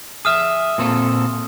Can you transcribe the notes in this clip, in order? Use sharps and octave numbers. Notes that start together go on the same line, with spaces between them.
G#4 E5 D#6 F6
A#2 C4 A4